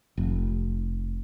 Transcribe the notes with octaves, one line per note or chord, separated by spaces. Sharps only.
F1